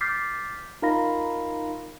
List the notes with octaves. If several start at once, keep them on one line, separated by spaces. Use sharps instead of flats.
D6 F6 G6 A6 B6 C7
D#4 F4 A#4 F5 B5 A#6